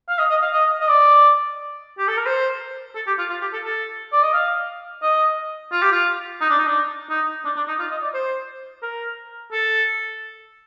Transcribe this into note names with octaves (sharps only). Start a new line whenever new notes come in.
F5
D#5
D#5
F5
D#5
D#5
D5
G4
A4
A#4
C5
A4
G4
F4
F4
G4
A4
A4
D5
D#5
F5
D#5
F4
G4
F4
D#4
D4
D#4
D4
D#4
D4
D4
D#4
F4
D#5
D5
C5
A#4
A4